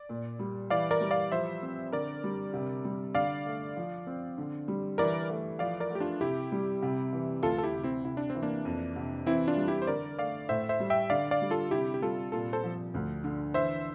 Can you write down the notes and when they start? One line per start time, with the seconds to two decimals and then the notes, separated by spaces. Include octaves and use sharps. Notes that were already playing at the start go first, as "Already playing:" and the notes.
Already playing: D5
0.09 A#2
0.39 G3
0.70 E3 D5 F5
0.91 A#4 D5
1.01 G3
1.11 D5 F5
1.32 F3 C5 E5
1.62 C4
1.92 D3 A#4 D5
2.24 G3
2.54 C3
2.84 G3
3.15 D3 D5 F5
3.46 A3
3.76 F3
4.07 C4
4.38 D3
4.68 G3
4.98 E3 A#4 D5
5.29 A3
5.59 F3 D5 F5
5.80 A#4 D5
5.90 A3 G4
6.00 D4 F4
6.21 C3 E4 G4
6.52 G3
6.82 C3
7.13 E3
7.43 D2 F4 A4
7.58 A4
7.63 E4 G4
7.74 C3
7.83 C4 E4
8.05 C3 E4
8.17 D4
8.30 C4
8.35 E3
8.42 A#3 D4
8.65 F2
8.96 C3
9.26 E3 C4 E4
9.47 D4 F4
9.57 G3
9.68 E4 G4
9.82 C5
9.87 D3 A#4 D5
10.19 A3 D5 F5
10.49 A2 C5 E5
10.69 C5 E5
10.80 G3
10.90 E5 G5
11.10 D3 D5 F5
11.31 D5 F5
11.41 G3
11.50 F4 A4
11.71 C3 E4 G4
11.94 G4
12.02 G3 F4 A4
12.32 A#2 F4 A4
12.53 A4 C5
12.63 F3
12.94 D2
13.24 D3
13.54 E3 C5 E5